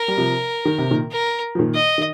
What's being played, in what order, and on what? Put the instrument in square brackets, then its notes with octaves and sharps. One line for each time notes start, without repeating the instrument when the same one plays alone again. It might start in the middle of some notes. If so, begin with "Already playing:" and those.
Already playing: [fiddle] A#4
[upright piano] G3
C3 F3
D#3
C3
A#2 D#3
[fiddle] A#4
[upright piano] F3
A#2 D#3
[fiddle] D#5
[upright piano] D#3